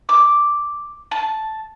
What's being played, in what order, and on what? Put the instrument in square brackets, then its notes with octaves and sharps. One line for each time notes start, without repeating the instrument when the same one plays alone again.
[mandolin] D6
A5